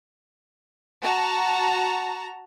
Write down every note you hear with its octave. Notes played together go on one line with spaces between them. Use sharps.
F#4 A5 A#5